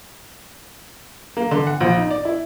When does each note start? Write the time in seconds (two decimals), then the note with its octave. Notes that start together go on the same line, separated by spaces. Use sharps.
1.37 A#3
1.51 D3
1.67 F#5
1.80 A#1
1.97 D#4
2.11 D5
2.25 E4